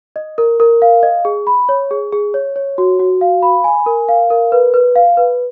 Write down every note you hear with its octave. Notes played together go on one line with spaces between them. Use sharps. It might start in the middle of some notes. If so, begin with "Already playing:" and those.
D#5
A#4
A#4
F5
D#5
G#4
B5
C#5
G#4
G#4
C#5
C#5
F#4
F#4
F5
B5
G#5
A#4
F5
A#4
B4
B4
F5
B4